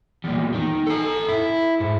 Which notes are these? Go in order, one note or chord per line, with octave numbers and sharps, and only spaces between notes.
E2 A#2
D#3
A4 G#5
E4
G#2